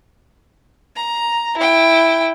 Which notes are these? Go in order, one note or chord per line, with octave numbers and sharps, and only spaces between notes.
A#5
E4 G5